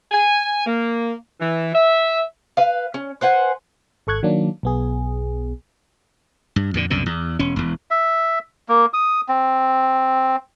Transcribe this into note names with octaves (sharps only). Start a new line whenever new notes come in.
G#5
A#3
E3
E5
B4 F5
C#4
B4 C5 F#5 G#5
G#1 A4 C#6 F#6 G#6
D#3 F#3 A#3 D4
B1 B3 G#4
G2
F2 A#2 D3
C2 F#2 B2 D3
E2
E1 C#4
E1 E2
E5
A#3
D#6
C4